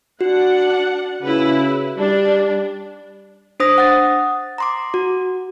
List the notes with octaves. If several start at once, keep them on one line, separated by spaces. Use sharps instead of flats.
D4 F#4 F#5
C#3 E4 B4
G3 D4
D4 C5 D#6 A#6
F#5 D#6 A6
A#5 C6 D6
F#4